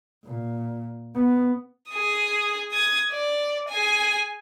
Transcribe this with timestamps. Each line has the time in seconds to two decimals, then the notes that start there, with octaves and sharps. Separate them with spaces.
0.24 A#2
1.15 B3
1.90 G#4 D#6
2.72 D#6 G#6
3.11 D5
3.69 G#4 G#5